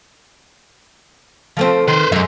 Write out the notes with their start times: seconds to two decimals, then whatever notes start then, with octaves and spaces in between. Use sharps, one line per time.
1.57 F3 A3 C4
1.88 D#3 B4 C5
2.12 F#2 G#3 E5